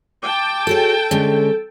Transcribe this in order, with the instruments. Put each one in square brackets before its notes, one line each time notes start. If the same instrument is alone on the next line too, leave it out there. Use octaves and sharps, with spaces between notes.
[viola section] G5 A5 [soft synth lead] D6
[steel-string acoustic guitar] F#4 G#4 C#5 [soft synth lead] A4
[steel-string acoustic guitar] D3 G#3 C#4